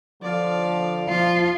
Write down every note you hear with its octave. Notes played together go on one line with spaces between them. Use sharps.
D3 F3 D5 F5
F3 F4